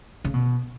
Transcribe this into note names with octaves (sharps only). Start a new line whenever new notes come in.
C#3
B2